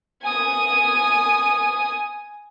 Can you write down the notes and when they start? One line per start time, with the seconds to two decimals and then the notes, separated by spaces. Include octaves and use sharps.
0.22 G#5 D#6